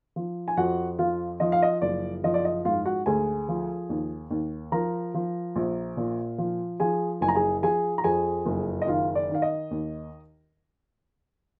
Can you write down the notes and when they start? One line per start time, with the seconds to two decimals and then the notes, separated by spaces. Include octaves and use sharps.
0.16 F3
0.48 G#5
0.57 F2 F#4 F#5
0.98 F3 F4 F5
1.40 F3 D#5
1.52 F5
1.62 D#5
1.82 F#1 D5
2.24 F3 D#5
2.34 D5
2.45 D#5
2.65 G#2 F4 F5
2.85 F#4 F#5
3.06 D2 G#4 G#5
3.49 F3
3.90 D#2
4.30 D#2
4.72 F3 A#4 A#5
5.14 F3
5.56 A#1
5.97 A#2
6.38 F3
6.80 F3 G#4 G#5
7.21 F#1 G#5
7.28 A#5
7.35 G#4 G#5
7.62 F3 G#4 G#5
7.98 A#5
8.04 F2 G#4 G#5
8.46 F#1
8.82 D#5
8.87 D#3 F4 F5
9.15 D5
9.29 D#3
9.34 F5
9.42 D#5
9.71 D#2